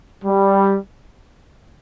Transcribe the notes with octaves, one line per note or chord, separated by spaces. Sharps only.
G3